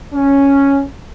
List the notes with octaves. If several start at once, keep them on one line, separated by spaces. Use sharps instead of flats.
C#4